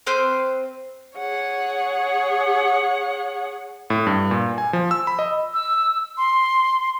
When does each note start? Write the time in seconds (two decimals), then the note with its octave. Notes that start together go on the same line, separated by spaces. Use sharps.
0.07 C4 B4 C5 F6
1.17 G#4 C#5 F#5
3.90 A2
4.07 G2
4.31 A#2
4.58 G#5
4.73 F3
4.91 E6
5.07 B5
5.19 D#5
5.54 E6
6.18 C6